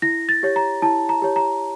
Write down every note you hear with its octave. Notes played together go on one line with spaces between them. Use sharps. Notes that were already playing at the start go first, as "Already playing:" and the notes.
E4 A#6
A6
G4 C#5
A#5
E4 A5
A#5
G4 C#5
A#5